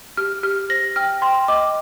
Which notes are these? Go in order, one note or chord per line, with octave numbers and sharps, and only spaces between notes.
G4 F6
G4 F6
C5 A#6
G5 F6
G5 C6
D#5 D6